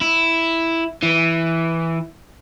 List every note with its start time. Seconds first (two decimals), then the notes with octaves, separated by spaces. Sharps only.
0.01 E4
1.03 E3